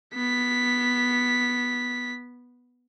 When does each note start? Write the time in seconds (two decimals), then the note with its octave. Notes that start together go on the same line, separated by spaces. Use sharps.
0.14 B3 B6